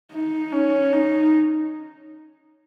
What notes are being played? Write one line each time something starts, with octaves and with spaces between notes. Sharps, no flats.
D#4
C#4
D#4